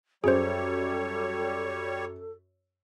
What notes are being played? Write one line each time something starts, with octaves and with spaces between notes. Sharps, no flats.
F#2 G3 G#4 A4 C5 C#5